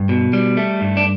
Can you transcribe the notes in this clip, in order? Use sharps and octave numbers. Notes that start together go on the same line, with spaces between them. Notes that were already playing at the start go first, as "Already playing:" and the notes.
Already playing: G2
B2
G3
A3
G2
D4